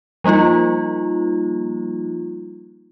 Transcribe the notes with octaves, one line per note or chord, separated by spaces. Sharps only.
F3 G3 A#3 D#4 F4